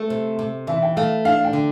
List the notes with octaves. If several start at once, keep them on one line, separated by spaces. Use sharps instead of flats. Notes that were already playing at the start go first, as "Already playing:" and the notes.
Already playing: A3
C3
C3
E3 E5
G5
A3 F5
D4 F5
G5
D3